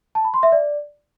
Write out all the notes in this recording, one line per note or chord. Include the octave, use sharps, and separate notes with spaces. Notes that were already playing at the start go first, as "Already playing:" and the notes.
A5
B5
C6
E5
D5